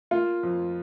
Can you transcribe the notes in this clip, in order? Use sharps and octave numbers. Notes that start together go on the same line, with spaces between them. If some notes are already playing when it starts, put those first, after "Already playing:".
A#3 F4
F2